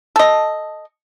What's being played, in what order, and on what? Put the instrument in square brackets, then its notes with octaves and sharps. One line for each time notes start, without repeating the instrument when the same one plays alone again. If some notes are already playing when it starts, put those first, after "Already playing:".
[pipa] A4 D#5